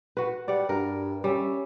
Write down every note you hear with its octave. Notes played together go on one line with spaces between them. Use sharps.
F#4 B4
G3 D5 F#5
G2 A#4
G3 C#4 E5